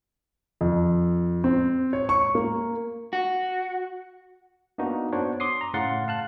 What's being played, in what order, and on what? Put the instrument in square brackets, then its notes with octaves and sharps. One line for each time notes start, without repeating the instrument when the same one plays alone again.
[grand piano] F2
C4
C#5
C#6
A#3
[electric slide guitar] F#4
[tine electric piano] A#3 B3 D4 D#4 F#4
B3 D4 F#4 C5 C#5
C6 D6 D#6 C7
A#5
A2 C#3 F5 F#5 C6 A6
F5 A5 F#6